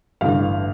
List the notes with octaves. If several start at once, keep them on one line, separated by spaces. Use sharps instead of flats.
A1 G2 D3 F5